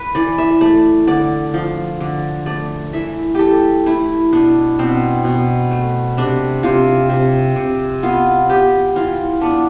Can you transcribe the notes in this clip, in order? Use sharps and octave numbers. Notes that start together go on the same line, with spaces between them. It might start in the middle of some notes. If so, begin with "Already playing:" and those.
Already playing: B4
E3 D5
E5
A3 D5
D3 D5
F3
D3
A3 D5
E3 E5
A3 G4 A4
A3 E4
B2 D4
B2 C4
B2
A3
C3 D4
C3 F4
C3
C3
B3 F4
B3 G4
E3 F4
B3 D4